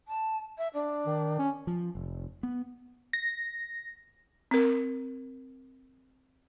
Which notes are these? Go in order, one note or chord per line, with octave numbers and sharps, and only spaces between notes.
A5
E5
D4
D#3
C#4
F3
F1
B3
A#6
C4 A#4